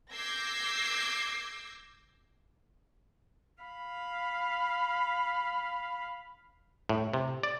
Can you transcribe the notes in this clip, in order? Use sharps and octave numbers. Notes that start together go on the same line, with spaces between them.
D6 E6 G6 G#6 A#6 C7
F5 B5
A2
C3
D5